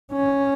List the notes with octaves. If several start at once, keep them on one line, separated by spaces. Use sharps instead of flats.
C#4